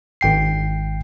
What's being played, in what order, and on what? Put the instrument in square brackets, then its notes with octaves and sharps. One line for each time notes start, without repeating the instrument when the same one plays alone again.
[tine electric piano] G#1 G5 C7